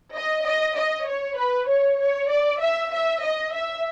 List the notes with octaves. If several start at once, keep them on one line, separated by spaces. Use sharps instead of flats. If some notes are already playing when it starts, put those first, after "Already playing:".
D#5
D#5
D#5
C#5
B4
C#5
C#5
D5
E5
E5
D#5
E5